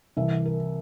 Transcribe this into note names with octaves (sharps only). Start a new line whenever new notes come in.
C2 C3 E3 E5
A#4